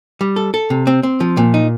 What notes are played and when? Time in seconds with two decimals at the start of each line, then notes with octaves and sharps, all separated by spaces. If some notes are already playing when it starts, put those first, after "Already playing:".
0.21 G3
0.36 A4
0.54 A4
0.70 C3
0.87 C4
1.03 C4
1.20 F3
1.37 A#2
1.54 D#4